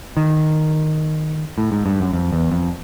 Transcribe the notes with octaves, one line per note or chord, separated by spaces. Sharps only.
D#3
A2
G#2
G2
F#2
F2
E2
F2